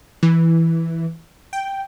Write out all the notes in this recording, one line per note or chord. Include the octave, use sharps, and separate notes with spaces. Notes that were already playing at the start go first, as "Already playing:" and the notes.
E3
G5